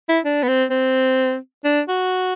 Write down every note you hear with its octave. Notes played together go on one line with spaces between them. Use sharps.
E4
D4
B3
C4
C4
D4
F#4